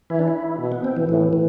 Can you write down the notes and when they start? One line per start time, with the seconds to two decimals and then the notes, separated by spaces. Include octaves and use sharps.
0.10 E3 E4
0.19 D4
0.28 E4
0.59 B2
0.72 B3
0.84 C4
0.97 E3
1.09 A2 E3
1.33 E3